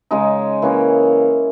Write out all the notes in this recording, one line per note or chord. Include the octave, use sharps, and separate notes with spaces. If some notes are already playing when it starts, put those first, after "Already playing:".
C#3 G#3 D#4
E3 A#3 C#4